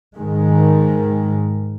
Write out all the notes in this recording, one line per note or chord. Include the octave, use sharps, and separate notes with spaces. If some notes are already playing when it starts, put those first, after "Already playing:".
G#2 D#3 G#3